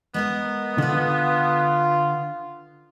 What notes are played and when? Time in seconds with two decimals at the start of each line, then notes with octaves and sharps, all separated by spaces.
0.14 G#3 B3 A#4 D#5
0.78 D3 F4 B4 F#5